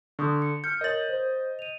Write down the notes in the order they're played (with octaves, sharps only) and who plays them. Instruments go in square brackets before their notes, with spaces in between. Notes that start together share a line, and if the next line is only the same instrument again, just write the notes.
[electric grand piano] D3 [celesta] C#6 D#6 G6
[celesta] C#7
[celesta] F6 C#7 [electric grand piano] G6
[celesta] A#4 C#5 F#7 [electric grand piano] D#5 A6
[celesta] C5
D#7 F7